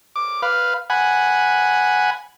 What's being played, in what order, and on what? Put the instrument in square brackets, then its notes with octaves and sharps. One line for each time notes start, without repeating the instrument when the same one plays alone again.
[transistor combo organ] D6
B4 F5
F#5 G#5 B5